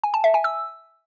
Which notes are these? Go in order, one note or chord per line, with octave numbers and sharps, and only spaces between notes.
G#5
A5
E5
G#5
E6